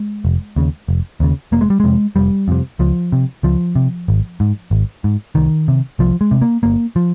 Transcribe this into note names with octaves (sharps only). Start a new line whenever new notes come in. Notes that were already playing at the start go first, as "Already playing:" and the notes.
Already playing: G#3
F1
D#2 C#3
F1
D#2 C#3
F1 A#3
G#3
G3
F2 C3 G#3
F1 G3
F2 C3
C#2 F3
C3
C#2 F3
C3
G#1
G#2
G#1
G#2
C2 D#3
C3
C2 F3
G#3
C3
A#3
G1 A#3
F3